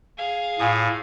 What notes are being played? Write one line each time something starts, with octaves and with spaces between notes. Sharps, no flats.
G#4 F5
A2 F4 G#5 D#6